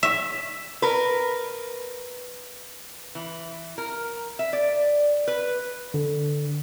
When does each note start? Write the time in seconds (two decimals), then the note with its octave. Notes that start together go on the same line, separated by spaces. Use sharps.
0.03 E5
0.82 A#4 B4
3.15 E3
3.78 A#4
4.39 E5
4.53 D5
5.28 B4
5.94 D3